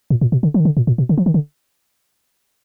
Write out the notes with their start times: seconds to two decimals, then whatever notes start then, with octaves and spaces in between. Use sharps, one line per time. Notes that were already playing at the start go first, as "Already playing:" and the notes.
0.10 A#2
0.21 A#2
0.32 B2
0.43 D3
0.54 F3
0.60 D#3
0.65 D3
0.77 A#2
0.87 A#2
0.98 B2
1.09 D3
1.18 F3
1.26 D#3
1.34 D3